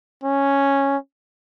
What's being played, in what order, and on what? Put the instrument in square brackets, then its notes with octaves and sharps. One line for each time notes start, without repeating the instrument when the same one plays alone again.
[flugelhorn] C#4